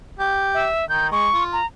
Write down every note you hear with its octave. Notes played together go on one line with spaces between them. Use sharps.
G4
E5
D#3 G6
G#3 C#6
F4
A#5